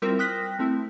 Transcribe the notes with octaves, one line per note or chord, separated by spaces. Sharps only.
G3 C4 E4 F4 A#4
G5 D#6 F6 F#6 A#6 B6
A3 C4 E4